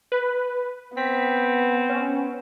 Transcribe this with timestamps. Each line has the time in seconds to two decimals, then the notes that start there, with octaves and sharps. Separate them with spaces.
0.12 B4
0.97 B3 C4 B6
1.89 C#4